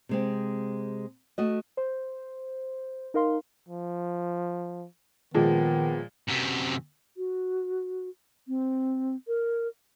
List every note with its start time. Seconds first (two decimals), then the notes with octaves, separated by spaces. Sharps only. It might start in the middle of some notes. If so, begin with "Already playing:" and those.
0.09 C3 G#3 C4
1.38 A3 F#4 D#5
1.77 C5
3.14 D#4 A#4 F5 C6
3.69 F3
5.34 A#2 D#3 F3 G#3 B3
6.29 F#2 C3
7.17 F#4
8.48 C4
9.28 A#4